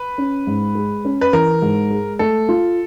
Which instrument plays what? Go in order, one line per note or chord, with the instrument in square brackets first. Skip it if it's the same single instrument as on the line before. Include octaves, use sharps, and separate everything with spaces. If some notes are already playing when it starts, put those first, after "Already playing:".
Already playing: [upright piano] B4
[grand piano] C#4
G#2
G#3
C#4
[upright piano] B4
[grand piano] E3 [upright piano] A#4
[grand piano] G#2
G#3
[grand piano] A3 [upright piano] A4
[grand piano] F4